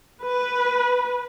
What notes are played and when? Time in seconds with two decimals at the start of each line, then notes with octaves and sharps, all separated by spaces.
0.25 B4